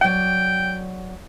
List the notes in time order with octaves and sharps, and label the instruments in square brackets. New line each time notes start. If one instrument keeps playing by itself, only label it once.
[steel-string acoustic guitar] F#3 D5 [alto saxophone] G5